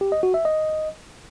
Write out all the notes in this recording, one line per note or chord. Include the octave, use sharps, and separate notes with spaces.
G4
D#5
F#4
E5
D#5